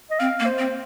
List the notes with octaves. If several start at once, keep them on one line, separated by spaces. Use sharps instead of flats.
D#5
C4 F5
A#3
C5
C4